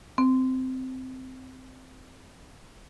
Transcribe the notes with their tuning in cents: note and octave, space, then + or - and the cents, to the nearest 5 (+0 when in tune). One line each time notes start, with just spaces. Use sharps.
C4 -15